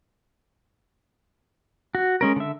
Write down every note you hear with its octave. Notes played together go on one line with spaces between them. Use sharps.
F#4
G#3 C#4 A#4
D3 E5